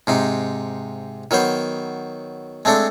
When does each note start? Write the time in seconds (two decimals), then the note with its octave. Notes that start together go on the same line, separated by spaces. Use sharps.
0.07 G#2 C3 D#4
1.31 D#3 F#3 B3 C5
2.65 G#3 A3 C4 D4 A4